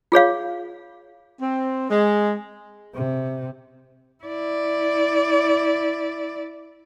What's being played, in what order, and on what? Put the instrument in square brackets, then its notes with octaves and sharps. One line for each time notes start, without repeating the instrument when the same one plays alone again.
[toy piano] F4 G#4 C#5 F5
[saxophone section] C4
G#3
[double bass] C3
[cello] E4 D5